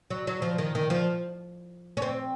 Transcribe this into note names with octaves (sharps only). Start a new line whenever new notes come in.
F#3
F#3
F3
D#3
D#3
F3
C#4
C4